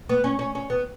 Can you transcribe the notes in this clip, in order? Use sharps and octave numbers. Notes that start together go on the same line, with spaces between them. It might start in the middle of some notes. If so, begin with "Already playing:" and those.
B3
C#4
C#4
C#4
B3